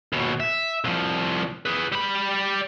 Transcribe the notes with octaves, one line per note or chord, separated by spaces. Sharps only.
D#2 B2
E5
C2 F3
G#4 B4
G3 B5